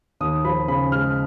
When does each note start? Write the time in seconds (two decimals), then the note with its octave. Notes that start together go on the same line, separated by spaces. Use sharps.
0.20 D#2 D#6
0.45 F3 B5
0.68 C#3 B5
0.92 G#3 F6